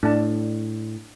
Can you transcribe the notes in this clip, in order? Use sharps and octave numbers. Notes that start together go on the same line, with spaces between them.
A2 D4 A5